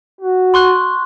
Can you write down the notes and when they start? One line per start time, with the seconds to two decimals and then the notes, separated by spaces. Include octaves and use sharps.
0.21 F#4
0.54 C6 C#6 F#6